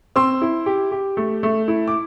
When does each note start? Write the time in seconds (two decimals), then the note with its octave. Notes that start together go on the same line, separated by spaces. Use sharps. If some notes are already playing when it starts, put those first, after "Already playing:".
0.16 C4 C6 E6
0.42 E4
0.66 G4
0.91 G4
1.17 A3
1.43 A3
1.68 E4
1.88 D6